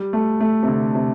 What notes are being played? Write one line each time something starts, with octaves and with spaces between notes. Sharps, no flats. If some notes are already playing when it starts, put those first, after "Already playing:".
Already playing: G3
A3
A3
C3
D3
C3